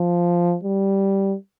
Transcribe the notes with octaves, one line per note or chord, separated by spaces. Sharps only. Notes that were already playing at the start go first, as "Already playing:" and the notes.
Already playing: F3
G3